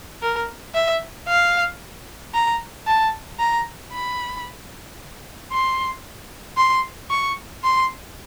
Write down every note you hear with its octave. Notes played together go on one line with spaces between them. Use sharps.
A#4
E5
F5
A#5
A5
A#5
B5
C6
C6
C#6
C6